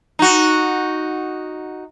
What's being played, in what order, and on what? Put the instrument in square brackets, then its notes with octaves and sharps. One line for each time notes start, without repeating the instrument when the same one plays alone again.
[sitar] D#4 F#4